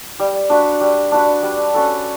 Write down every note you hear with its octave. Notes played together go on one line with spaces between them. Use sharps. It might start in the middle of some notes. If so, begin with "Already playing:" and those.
G3
D4 F#4 B4
G3
D4 F#4 B4
G3
C#4 F#4 A4